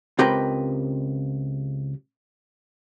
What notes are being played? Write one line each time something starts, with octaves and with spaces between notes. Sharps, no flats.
C#2 C4 G4 A#4 B4 G5